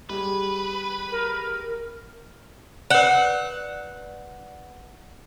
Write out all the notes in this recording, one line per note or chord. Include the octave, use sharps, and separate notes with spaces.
G3 G#4 B4
A#4
B4 D5 F#5